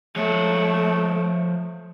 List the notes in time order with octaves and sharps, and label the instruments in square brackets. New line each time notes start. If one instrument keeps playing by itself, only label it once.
[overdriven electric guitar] F3 C#5 [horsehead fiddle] A3